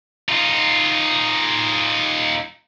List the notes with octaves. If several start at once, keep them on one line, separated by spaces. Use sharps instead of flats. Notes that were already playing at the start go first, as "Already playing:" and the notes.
D#4 F4